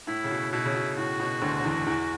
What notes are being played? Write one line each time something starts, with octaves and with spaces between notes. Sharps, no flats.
A2 E4
C#3
B2
B2 E4
C#3
B2
A2 F#4
B2
D2 D3
D3
E2 E3
E2 E3